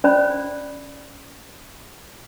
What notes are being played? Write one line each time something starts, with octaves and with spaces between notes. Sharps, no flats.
C#4 C5 D5 B5